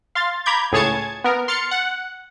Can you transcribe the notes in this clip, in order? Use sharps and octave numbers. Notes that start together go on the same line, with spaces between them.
F5 C6 A6
A#5 B5 D6 G6 G#6
C#2 A2 G#4 C#5 A5 G#6
B3 A#4
C6 F6 A6 C#7
F#5